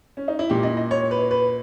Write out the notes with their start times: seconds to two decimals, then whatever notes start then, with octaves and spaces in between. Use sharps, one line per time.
0.17 C#4
0.28 D#4
0.39 E4
0.50 A#2 G4
0.63 D#5
0.77 D#5
0.91 C#5
1.11 B4
1.31 B4